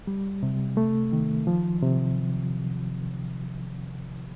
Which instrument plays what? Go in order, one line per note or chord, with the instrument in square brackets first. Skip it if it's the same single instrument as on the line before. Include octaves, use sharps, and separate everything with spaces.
[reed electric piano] G3
C3
A3
D#3
F3
C3